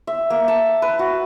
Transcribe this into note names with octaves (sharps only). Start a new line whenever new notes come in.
E5
A#3
A5
B4
F#4